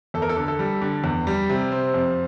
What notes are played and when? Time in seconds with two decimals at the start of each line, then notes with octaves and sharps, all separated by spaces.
0.14 E2 A4
0.22 A#4
0.29 A4
0.36 D3
0.48 A4
0.59 G3
0.82 D3
1.04 E2
1.27 G3
1.49 C3
1.71 C4
1.94 F2